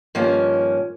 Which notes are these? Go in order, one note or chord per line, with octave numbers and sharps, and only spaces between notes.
G2 D#3 F3 A#3 C#4